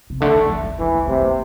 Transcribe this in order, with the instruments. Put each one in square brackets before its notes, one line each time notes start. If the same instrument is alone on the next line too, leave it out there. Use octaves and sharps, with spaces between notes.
[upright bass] C3
[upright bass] D3 [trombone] A3
[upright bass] E3
E3
E3
[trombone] E3 [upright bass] G3
[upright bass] G3
[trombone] C3 [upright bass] A3
[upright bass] A#3